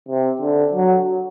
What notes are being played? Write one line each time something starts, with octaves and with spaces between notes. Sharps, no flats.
C3
D3
F#3